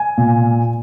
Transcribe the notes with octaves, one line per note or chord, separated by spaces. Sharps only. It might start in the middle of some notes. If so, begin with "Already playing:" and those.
Already playing: G#5
A#2